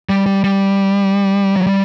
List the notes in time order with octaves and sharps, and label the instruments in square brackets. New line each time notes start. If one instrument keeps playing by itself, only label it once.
[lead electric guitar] G3
G3
G3
F#3
G3